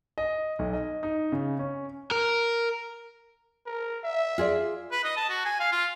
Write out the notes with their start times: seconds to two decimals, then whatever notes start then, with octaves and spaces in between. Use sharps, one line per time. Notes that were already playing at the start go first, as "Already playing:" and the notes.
0.18 D#5
0.59 B1
0.73 D#5
1.03 D#4
1.32 C#3
1.59 C#4
2.11 A#4
3.66 A#4
4.04 E5
4.38 F4 G#4 D5
4.92 B4
5.04 D#5
5.17 A5
5.30 F#4
5.45 G#5
5.60 F5
5.72 F4